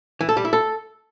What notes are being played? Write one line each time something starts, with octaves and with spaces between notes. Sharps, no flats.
E3
A4
G3
E4
A4